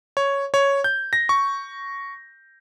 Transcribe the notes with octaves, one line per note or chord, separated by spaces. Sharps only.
C#5
C#5
G6
A#6
C#6